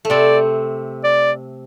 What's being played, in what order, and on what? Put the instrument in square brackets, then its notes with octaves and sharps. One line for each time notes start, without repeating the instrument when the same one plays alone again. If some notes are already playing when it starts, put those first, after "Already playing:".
[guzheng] A3
[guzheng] C3 C4 [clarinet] D5
[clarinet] D5